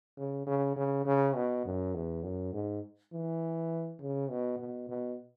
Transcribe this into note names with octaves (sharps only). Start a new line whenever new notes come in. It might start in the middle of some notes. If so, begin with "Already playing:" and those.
C#3
C#3
C#3
C#3
B2
F#2
E2
F#2
G#2
E3
C#3
B2
B2
B2